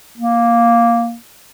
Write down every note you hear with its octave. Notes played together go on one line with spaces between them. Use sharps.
A#3